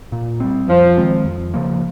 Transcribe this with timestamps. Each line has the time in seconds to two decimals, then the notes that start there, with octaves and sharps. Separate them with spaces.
0.12 A#2
0.40 G3 C4
0.69 F2 F3
0.97 D#3 G#3 C4
1.25 F2
1.54 C#3 F3 A#3